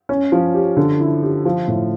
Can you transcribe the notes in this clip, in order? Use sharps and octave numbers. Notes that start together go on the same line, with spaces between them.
C#4
F3
G4
D3
E4
G4
F3
A2